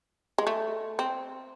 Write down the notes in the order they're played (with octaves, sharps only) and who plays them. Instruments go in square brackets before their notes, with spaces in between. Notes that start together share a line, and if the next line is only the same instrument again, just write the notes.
[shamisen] G#3
A3
C4